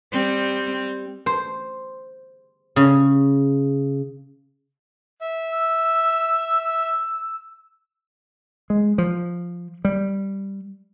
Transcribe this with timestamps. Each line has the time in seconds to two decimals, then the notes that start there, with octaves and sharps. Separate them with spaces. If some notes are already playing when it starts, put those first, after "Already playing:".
0.12 G3 C4
1.26 C5
2.76 C#3
5.21 E5
5.52 E6
8.70 G#3
8.98 F3
9.85 G3